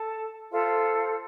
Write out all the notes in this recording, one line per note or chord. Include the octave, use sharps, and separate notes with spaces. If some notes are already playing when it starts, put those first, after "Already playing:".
Already playing: A4 A5
F4 A4 C5 E5